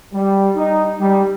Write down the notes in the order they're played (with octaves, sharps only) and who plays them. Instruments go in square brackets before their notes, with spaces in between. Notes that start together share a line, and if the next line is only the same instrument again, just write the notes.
[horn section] G3
D#4
G3